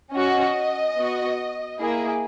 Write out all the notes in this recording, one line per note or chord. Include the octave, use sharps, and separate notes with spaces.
C#4 F#4 D#5
B3 F#4
A#3 E4 G#4